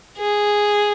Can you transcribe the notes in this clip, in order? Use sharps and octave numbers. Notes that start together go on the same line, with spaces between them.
G#4